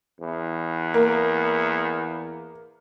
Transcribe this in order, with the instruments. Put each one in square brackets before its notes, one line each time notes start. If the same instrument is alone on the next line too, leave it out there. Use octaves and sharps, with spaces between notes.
[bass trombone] E2
[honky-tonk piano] A#3